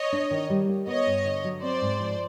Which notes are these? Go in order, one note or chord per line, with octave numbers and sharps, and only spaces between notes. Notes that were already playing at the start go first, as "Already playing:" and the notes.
Already playing: C#5 D#5
D4
D#3
G3
A#3
B3 C#5 D#5
G2
D3
F#3
C4 C5 D5
G#2
F3